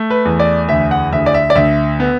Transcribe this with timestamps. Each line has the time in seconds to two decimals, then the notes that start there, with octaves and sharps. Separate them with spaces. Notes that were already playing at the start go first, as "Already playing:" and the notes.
Already playing: A3
0.10 B4
0.25 E2
0.39 D5
0.69 D2 E5
0.91 F#5
1.12 D2 E5
1.26 D5
1.34 E5
1.50 D5
1.55 D2 E5
2.00 B3